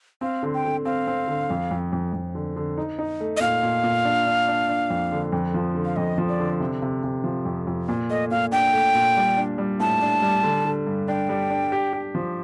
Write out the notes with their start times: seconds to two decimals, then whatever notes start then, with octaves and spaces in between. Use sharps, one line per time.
0.21 C4 F5
0.43 D3
0.54 G5
0.65 D3
0.85 C4 F5
1.07 C4
1.28 D3
1.50 F2
1.71 F2
1.92 F2
2.13 F2
2.35 D3
2.56 D3
2.78 D#4
2.99 D#4
3.20 A3
3.37 D#5
3.41 A#2 F5
3.63 A#2
3.83 A#2
4.05 D4
4.27 D4
4.48 D4
4.69 D4
4.90 F2
5.12 D3
5.32 F2
5.54 F3
5.75 D3
5.85 F5
5.96 F2 D#5
6.18 F3
6.28 D5
6.40 D3
6.60 C3
6.82 C3
7.04 C3
7.24 F3
7.45 F2
7.67 F2
7.88 A#2
8.10 A3 D#5
8.31 A#2 F5
8.52 D4 G5
8.73 A3
8.95 A#2
9.17 G3
9.37 D4
9.58 G3
9.80 A2 A5
10.02 D4
10.22 G3
10.43 D3
10.65 D3
10.87 G2
11.08 D4 G5
11.29 G3
11.50 D4
11.72 G4
11.93 G4
12.15 F3